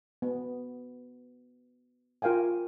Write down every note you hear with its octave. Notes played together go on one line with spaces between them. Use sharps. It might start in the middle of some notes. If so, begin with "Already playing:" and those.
B3
F4 A#4 F5 G5 G#5